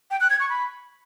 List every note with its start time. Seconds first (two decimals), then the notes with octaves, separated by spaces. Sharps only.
0.11 G5
0.21 F#6
0.30 G#6
0.40 C#6
0.50 B5